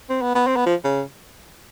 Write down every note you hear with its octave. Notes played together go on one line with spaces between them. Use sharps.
C4
B3
B3
C4
B3
F3
C#3